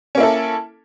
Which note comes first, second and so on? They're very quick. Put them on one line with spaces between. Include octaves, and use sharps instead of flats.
C#4 A#3 E4 A4